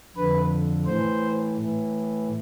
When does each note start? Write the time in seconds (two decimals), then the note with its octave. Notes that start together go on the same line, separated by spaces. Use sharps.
0.16 F2 D3 B4
0.86 A2 E3 C5
1.58 A2 E3